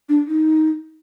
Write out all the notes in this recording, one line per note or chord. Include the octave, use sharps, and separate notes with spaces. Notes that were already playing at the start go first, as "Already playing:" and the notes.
D4
D#4